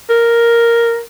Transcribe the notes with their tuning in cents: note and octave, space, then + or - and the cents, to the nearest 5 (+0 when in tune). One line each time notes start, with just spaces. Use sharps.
A#4 +0